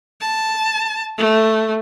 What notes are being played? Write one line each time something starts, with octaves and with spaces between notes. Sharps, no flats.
A5
A3